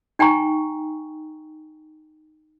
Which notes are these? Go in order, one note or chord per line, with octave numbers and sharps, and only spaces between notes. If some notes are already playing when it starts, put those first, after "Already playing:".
D#4 G5 G#5 A#5 C#6